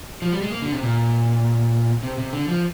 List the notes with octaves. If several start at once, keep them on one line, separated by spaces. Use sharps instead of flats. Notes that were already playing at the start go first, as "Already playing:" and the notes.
F3
G3
G#3
A#3
D3
C3
A#2
C3
C3
D3
F3